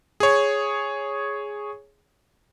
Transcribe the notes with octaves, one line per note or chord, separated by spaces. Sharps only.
G#4 C#5